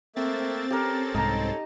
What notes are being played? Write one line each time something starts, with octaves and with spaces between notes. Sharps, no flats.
A3 A#3 C4 E5 A6
C#4 G4 A4 A#4
C2 G#2 D#4 A5 A#5